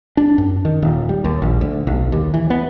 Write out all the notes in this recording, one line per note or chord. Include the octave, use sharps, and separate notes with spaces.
D4
F#2
D#3
D#1
G3
D#2
A#1
D2
B1
D#2
E3
B3